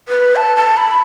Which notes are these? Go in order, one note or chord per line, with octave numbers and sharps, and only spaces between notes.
B4
A5
A5
B5